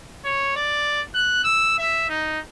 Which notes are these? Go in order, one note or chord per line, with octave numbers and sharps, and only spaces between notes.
C#5
D5
F#6
E6
E5
D#4